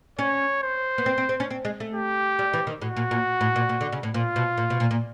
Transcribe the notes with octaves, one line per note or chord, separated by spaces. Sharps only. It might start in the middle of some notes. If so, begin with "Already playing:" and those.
C#4 C#5
C5
B3
C4
C4
C4
C#4
C4
G#3
A3
G4
G3
E3
D#3
A2 F#4
A#2
A#2
A2
A#2
A#2
D3
C#3
A2
A#2 F4
B2
A#2
B2
A#2
A#2